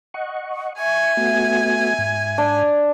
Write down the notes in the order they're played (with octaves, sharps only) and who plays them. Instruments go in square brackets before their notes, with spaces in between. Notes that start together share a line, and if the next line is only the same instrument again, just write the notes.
[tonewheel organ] D#5 F#5 C#6
[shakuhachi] E5 [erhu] G#5 [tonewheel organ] C#6
[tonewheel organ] A3 B3 F#4
G#2
[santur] D4